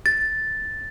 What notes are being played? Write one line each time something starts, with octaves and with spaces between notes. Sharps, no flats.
A6